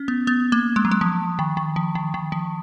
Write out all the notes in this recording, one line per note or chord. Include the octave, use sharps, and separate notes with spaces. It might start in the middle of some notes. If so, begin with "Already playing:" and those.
Already playing: C#4
B3
B3
A#3
G#3
F#3
G#3
F3
D#3
D#3
F3
D#3
D#3
F3